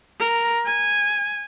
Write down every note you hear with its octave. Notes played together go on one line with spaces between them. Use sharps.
A#4
G#5